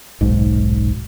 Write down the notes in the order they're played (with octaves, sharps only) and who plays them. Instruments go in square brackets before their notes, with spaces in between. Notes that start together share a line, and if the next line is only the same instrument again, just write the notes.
[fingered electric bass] D#1 B1 G#2